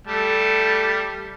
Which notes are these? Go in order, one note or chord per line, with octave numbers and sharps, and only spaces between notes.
G3 A3 A5